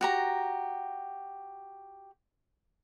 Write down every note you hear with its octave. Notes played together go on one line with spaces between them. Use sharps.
F#4 G4 A#5